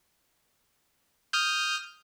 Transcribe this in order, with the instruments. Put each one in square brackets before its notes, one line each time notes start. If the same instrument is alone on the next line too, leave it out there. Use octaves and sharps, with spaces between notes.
[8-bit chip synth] D#6 F6 G6